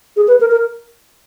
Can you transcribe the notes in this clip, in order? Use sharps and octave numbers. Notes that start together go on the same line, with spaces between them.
G#4
B4
A#4
A#4